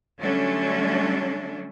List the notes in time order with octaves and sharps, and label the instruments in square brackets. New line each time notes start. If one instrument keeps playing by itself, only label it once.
[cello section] D3 F#3 G3 A3 C#4 D4